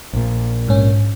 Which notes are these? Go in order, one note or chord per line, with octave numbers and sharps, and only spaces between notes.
A#1 A#2
G#2 C#4